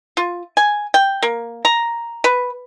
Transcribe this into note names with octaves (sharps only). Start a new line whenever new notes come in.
F4
G#5
G5
A#3
A#5
B4